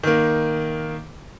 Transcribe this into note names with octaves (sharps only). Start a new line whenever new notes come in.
D#3 A#3